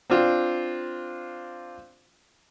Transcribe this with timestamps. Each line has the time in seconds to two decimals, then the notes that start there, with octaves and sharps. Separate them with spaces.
0.10 C4 D4 F4